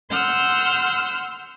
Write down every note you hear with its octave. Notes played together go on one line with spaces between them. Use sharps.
F#5 C6 E6 F6 G6